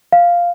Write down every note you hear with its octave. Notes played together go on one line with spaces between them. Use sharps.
F5